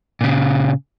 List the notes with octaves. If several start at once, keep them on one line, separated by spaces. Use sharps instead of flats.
A#2 C#3